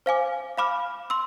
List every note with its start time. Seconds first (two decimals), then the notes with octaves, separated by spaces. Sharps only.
0.06 C5 F5 G#5 D6
0.58 F5 B5 D6 F6
1.10 C6 E6